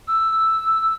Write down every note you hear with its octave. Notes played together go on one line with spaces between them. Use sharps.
E6